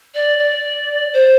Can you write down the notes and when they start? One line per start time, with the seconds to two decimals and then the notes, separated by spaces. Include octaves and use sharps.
0.15 D5
0.39 D5
1.13 C5